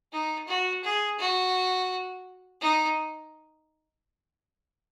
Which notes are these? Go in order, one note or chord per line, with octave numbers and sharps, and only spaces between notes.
D#4
F#4
G#4
F#4
D#4